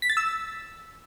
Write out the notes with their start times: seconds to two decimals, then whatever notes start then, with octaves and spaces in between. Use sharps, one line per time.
0.02 B6
0.10 A6
0.17 E6